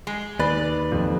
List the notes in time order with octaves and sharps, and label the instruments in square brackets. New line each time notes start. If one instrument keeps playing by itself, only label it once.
[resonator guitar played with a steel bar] G#3
[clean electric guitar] D#2 B4 [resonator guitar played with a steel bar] D5
[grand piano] F2